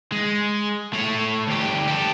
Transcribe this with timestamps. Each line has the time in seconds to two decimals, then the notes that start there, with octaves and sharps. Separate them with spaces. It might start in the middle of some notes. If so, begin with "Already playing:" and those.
0.12 G#3
0.93 A3 C#5
1.47 D2 G4
1.87 G4 A4